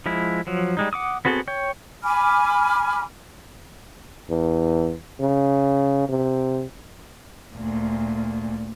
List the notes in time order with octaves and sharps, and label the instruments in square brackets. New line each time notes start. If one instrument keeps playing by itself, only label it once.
[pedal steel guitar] F3 G#3 E4
F3 F#3
G3 G#3 D#4
F#5 D6 D#6
B3 C4 F#4 G#4 A4
C#5 G5
[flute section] G#5 B5 D6 F6
[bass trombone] E2
C#3
C3
[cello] D2 A#2